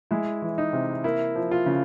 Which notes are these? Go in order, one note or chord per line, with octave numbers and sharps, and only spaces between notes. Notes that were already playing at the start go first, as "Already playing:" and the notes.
G#3 E4
E3
D#4
C3
A#3 E4
F3
F4
C#3